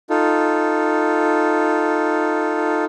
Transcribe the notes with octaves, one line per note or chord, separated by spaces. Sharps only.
D#4 F4 A4